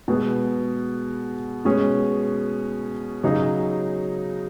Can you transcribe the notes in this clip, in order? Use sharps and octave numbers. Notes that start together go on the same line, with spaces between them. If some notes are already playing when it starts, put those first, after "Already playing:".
B2 G#3 B3 G#4
B2 G#3 C#4 G#4
C#3 F#3 D#4 G#4